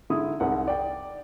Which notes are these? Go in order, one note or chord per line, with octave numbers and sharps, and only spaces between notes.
G#2 D3 E4 D#6
C2 G#2 F#5
D5 G5